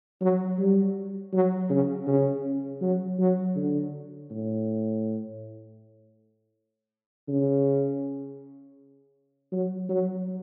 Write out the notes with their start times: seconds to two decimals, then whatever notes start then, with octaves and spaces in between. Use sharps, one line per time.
0.21 F#3
0.59 G3
1.33 F#3
1.70 C#3
2.07 C#3
2.82 F#3
3.19 F#3
3.56 D3
4.31 A2
7.28 C#3
9.52 F#3
9.89 F#3